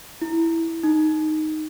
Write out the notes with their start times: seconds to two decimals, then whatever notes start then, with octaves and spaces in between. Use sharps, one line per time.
0.22 E4
0.83 D#4